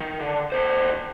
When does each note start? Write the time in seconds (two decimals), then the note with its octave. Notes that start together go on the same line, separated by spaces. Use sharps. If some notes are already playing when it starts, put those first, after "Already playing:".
0.01 D#3
0.20 D3
0.52 D#2 C5